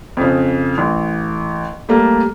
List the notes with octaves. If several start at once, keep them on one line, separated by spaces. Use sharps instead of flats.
F2 C#3
A1
G3 A3 A#3